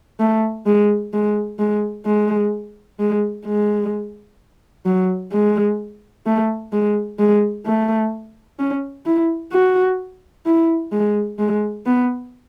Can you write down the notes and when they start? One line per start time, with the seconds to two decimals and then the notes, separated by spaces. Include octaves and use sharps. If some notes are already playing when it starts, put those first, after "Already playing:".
0.20 A3
0.66 G#3
1.14 G#3
1.59 G#3
2.06 G#3
3.00 G#3
3.46 G#3
4.86 F#3
5.32 G#3
6.26 A3
6.72 G#3
7.19 G#3
7.66 A3
8.59 C#4
9.06 E4
9.52 F#4
10.46 E4
10.92 G#3
11.39 G#3
11.86 B3